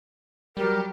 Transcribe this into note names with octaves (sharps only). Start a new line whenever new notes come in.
F#3 G3 G4 A#4